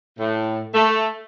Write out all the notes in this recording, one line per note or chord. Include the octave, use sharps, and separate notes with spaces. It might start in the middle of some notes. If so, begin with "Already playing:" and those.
A2
A3